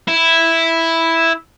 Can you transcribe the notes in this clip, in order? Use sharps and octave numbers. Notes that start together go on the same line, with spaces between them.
E4